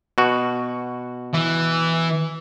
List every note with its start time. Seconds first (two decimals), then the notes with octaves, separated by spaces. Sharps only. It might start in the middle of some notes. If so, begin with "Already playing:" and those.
0.18 B2 F#4
1.33 E3